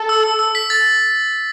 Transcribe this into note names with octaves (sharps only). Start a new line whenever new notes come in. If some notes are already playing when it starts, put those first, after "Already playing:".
Already playing: A4
E6
E6
E6
B6
A6